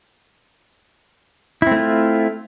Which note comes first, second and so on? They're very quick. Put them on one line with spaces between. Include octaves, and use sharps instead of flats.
E4 C4 A3 F4